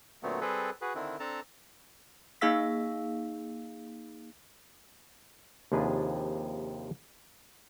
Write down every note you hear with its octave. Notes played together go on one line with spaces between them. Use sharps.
A#2 D3 F#3 A3 B3 C4
G3 C4 G#4 A4 B4
F#4 G#4 B4
D3 D#3 C4 D4 E4
C4 D4 A4 A5 A#5
A#3 D#4 G#4 F5 E6 B6
D#2 C3 F3 D4 G#4 B4